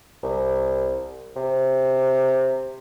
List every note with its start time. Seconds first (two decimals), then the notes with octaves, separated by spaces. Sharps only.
0.23 C2
1.36 C3